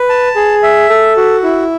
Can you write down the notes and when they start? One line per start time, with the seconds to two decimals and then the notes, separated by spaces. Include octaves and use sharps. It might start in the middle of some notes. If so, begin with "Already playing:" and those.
Already playing: B4
0.09 A5
0.36 G#4
0.63 E5
0.89 A4
1.17 F#4
1.43 E4